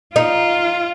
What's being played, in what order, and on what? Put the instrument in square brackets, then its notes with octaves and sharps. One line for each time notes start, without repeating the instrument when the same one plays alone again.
[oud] D#4 [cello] F4